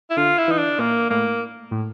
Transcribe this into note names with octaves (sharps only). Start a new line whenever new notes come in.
E4
D3 F4
E4
E3 D#4
D4
A#2 A#3
A2 A#3
A2